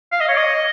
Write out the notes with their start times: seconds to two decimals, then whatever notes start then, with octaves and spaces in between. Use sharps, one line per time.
0.12 F5
0.20 D#5
0.28 C#5
0.37 D#5